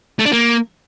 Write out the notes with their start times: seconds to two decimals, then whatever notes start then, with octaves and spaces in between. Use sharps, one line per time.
0.19 A3
0.26 D4
0.32 A#3